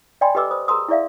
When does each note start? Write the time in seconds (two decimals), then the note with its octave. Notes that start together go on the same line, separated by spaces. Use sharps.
0.21 D5 D#5 G5 G#5 B5 C6
0.35 G4 A4 B4 D#5 D6 E6
0.51 C5 B5 D#6
0.68 G#4 A#4 A#5 C6 D#6
0.89 E4 G#4 D5 E5 F5